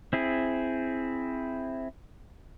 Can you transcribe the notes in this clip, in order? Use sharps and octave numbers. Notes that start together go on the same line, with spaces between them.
C4 E4 G#4